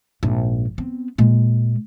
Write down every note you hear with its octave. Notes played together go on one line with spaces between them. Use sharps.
A#1 G#2
B3 C4
A#2 G#3